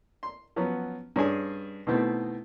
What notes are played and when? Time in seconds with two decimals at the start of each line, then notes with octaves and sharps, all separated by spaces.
0.23 C6
0.56 F3 F#3 B3 C#4
1.16 G2 C#4 D4 G#4 G#5
1.87 B2 D#3 E3 A3 B3 C4